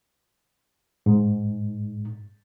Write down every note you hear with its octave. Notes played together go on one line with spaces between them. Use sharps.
G#2